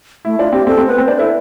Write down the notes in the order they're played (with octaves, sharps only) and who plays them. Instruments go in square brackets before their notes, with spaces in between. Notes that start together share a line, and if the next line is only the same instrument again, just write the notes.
[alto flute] A3 [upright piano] E4
[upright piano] D4 [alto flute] F4
[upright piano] C4 [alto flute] G4
[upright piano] C4 [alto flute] A4
[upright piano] C4
[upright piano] B3 [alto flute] B4
[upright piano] C4
[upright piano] D4 [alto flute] C5
[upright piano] E4 [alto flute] A4